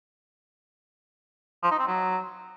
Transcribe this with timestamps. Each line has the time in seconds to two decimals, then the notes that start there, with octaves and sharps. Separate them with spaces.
1.63 F3
1.71 D#4
1.79 C4
1.87 F#3